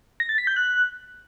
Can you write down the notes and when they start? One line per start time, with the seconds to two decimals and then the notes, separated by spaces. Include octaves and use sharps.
0.20 A#6
0.29 A6
0.38 B6
0.47 G6
0.56 F#6